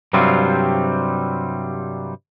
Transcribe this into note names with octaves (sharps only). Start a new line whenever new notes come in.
G2 C3 F#3 G3 C4 F4